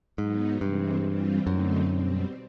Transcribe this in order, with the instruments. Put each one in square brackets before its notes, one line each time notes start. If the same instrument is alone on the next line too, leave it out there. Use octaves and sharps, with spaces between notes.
[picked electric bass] G#2 [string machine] F#3 B3 D#4
[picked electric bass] G2 [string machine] C3 E3 G#3 C4
[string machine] E3 G3 C4 F4
[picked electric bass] F#2 [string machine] D3 F#3 A3 C4 D#4
[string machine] B2 G3 C4